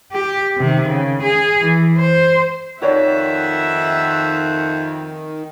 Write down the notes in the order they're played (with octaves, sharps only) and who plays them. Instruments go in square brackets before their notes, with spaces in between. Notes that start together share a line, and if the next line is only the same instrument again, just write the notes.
[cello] G4
C3 D#3
C#3
G#4
E3
C5
[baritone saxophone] F2 [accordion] D#3 [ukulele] F#4 C#5 D5 [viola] E5 F#5